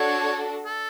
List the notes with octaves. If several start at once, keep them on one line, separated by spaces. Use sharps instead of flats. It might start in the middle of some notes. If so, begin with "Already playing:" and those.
Already playing: D4 F#4 A4 C#5
A4